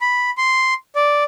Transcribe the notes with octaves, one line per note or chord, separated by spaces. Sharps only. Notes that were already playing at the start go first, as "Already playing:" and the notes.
B5
C6
D5